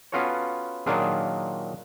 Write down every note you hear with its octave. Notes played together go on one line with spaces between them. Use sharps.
B3 C#4 F4 F#4 A4 C#5
A#2 D#3 F#3 D4 F4 G#4